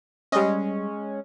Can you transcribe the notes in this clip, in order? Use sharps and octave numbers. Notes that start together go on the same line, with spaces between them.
G3 G#3 C#4 D#5